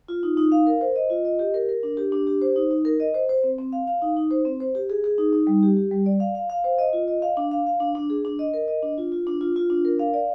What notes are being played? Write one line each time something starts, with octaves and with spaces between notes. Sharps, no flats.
F4
D#4
D#4
F5
A#4
C5
D#5
F4
D#5
G4
A#4
A#4
D4
G4
D4
G4
C5
D#4
D#4
A#4
D#5
C5
C5
C4
C4
F5
F5
D#4
D#4
C5
C4
C5
G4
G#4
G#4
D#4
D#4
G3
G4
G4
G3
D5
F5
F5
F5
C5
D#5
F4
D#5
F5
D4
F5
F5
D4
D4
G#4
D4
D#5
A#4
D#5
D4
F4
F4
D4
F4
F4
D4
A#4
F5
D5